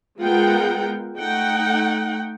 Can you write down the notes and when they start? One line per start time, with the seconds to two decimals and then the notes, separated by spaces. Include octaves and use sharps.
0.20 G#3 B3 F4 A#4 F#5 G5
1.17 A3 D#4 F#5 G5